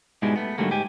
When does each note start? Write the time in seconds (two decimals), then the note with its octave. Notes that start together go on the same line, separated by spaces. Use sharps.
0.22 G#2 B2 G3 G#3 E4
0.36 A3 B3
0.58 G#2 D3 F#3 G3 A3 A#3
0.70 G#2 G4 G#5